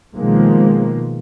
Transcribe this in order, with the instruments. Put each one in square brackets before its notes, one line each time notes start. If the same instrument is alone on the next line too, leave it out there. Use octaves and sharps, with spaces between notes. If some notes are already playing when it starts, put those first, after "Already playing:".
[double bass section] B2 D#3 F3 G#3 A#3